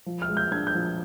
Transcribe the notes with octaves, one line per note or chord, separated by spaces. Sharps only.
F3
F6
G#3
G6
D4 G#6
G6
F3